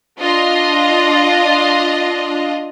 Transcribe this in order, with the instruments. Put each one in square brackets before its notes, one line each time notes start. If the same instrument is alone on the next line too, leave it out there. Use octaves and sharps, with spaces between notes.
[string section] D4 F4 D#5